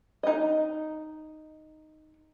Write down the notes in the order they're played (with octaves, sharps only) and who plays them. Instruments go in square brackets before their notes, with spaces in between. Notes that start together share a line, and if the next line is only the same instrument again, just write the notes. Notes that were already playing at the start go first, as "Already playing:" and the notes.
[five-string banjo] D#4 D#5